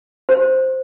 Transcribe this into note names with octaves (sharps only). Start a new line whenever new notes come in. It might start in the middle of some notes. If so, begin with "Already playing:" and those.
C5